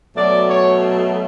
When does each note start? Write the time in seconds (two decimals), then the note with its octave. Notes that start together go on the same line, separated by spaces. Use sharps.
0.15 B2 F#3 A3 D5
0.48 C#5